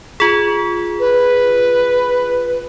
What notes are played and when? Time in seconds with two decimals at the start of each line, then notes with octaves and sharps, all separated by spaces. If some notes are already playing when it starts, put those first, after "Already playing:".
0.20 F4 G#4
0.99 B4